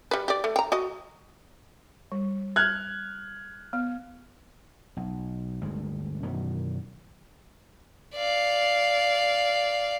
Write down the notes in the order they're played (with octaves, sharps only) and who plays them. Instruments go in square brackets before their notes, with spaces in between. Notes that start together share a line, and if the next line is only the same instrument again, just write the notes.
[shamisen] G3 B4
G4 D5
A3
G5 A#5
F#4 D#5
[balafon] G3
[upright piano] F6 F#6 G#6
[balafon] B3
[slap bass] B1
G1 D2 G#3
F#2 B2 D#3 E3
[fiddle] D5 F5